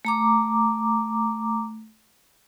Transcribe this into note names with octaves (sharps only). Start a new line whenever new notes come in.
A3 A#5 D6